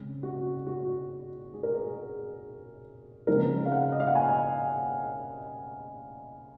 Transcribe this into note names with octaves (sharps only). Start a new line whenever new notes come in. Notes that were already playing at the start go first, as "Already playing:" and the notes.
Already playing: C#3 G#3 C4 G#4
F#4
F#4
G#4
A#4
G#4
C#3 F3 G#3 C4 A#4
F5
F#5
D#5
F5
F#5
G#5